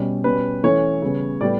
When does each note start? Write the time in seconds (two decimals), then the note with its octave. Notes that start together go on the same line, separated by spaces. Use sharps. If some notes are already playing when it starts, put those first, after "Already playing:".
Already playing: B2 G3 C#4
0.24 B2 G3 C#4 B4
0.63 E3 A3 C#4 C#5
1.02 C#3 G3 B3
1.41 A2 G3 B3 D5